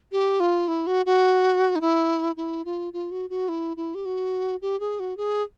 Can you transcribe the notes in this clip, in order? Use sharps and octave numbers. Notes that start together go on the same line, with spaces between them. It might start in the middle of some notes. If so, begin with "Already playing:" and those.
G4
F4
E4
F#4
F#4
D#4
E4
E4
F4
F4
F#4
F#4
E4
E4
G4
F#4
G4
G#4
F#4
G#4